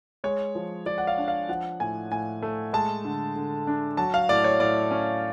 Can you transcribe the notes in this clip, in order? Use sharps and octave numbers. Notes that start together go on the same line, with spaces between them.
G#3 C#5
F3
F3 D5
F#5
F5
D4
F5
F3 F#5
A2 G#5
A2 G#5
A3
G#3 A5
D3
D3
D4
F#3 A5
F5
A2 D5
C#5
A2 D5
C#4